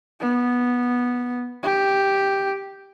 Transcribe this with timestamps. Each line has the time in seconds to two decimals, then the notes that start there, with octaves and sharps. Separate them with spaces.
0.21 B3
1.63 G4